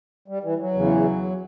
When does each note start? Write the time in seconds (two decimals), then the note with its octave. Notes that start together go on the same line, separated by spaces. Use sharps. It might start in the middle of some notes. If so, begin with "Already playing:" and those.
0.28 G3
0.43 E3
0.59 F#3
0.74 E2 C#3 E3